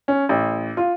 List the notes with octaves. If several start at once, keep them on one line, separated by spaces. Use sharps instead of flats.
C#4
A1
F4